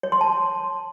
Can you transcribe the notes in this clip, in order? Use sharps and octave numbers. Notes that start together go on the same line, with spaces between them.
C#5
C6
A5